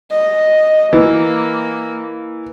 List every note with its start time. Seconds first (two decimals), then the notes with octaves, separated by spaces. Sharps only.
0.11 D#5
0.93 E3 A#3